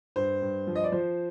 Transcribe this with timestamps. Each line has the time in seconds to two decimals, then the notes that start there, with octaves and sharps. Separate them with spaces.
0.16 G2 C5
0.42 G2
0.67 F3
0.75 D#5
0.84 D5
0.92 F3 C5